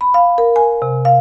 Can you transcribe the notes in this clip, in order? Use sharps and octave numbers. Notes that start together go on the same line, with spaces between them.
B5
F5
A#4
G#5
C3
F5